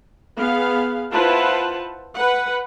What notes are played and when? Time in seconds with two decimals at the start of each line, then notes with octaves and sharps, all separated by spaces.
0.37 B3 G#4 F5
1.12 E4 F4 B4 C5 F#5 A5
2.14 B4 F#5